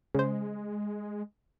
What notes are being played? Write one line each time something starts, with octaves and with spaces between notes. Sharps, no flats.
C#3 G#3 C5